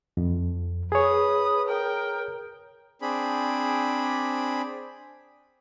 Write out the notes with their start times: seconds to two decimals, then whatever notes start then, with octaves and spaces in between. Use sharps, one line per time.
0.17 F2
0.92 G#4 B4 C#5 D#6
1.67 A#4 G5
3.02 C4 D4 G#4 B5